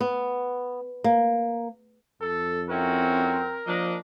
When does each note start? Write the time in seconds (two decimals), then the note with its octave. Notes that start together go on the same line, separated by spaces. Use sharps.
0.01 B3
1.04 A#3
2.21 F2 A4
2.70 C4 C#4 E4 F#4 A#4
3.67 F3 A#3 D4 D#5